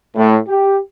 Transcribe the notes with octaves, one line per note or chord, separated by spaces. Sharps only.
A2
G4